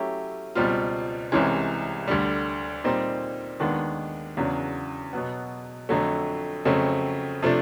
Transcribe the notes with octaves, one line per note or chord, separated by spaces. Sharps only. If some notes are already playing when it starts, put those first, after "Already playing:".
Already playing: F#3 A3 C#4 E4 G4
C#2 B2 G3 C4 F4
C2 C3 E3 G#3 C#4
D2 D3 G3
A#2 G3 C4 D#4
D#2 D#3 G#3 B3 D4
E2 C#3 F#3 B3 D4
B2 F#3 B3
F2 D3 F#3 A3
F2 C#3 F#3 A3 C4
C3 F3 A3 D4